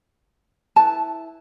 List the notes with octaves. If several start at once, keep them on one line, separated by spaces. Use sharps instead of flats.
E4 B4 A5